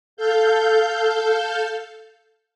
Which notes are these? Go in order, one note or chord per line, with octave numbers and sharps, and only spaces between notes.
A4 F5 G6